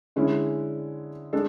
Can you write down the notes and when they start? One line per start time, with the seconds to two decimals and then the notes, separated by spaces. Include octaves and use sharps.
0.16 D3 G#3 C#4 E4
1.33 G#3 D4 A4